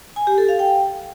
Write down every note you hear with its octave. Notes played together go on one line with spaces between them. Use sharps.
G#5
G4
A4
F5
G5